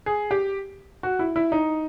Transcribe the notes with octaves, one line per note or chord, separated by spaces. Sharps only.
G#4
G4
F#4
E4
E4
D#4